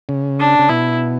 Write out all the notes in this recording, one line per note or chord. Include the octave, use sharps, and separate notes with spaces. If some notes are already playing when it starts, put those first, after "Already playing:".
C#3
D4
C#3
B2 E4